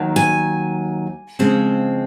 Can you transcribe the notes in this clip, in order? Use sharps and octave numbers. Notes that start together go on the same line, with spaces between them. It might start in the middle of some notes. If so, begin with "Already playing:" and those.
Already playing: D#2 D#3 F#3
G#5
C#3 F3 G#3 C4